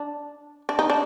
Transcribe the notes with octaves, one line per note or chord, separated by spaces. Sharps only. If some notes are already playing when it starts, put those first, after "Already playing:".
Already playing: D4
D4
D#4
D4